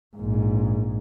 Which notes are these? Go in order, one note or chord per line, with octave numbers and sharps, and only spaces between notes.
A#1 G#2